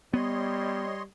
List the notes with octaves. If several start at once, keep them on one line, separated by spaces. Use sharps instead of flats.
G3 B3 C#5 D#5 C6